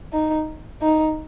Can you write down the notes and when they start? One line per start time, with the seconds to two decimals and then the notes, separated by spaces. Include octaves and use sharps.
0.13 D#4
0.82 D#4